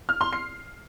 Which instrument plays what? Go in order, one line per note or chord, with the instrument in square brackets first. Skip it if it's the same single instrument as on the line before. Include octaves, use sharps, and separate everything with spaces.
[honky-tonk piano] F6
C6
C7